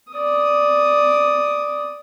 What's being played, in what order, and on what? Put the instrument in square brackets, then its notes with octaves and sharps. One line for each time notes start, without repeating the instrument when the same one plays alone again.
[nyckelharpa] D5 D#6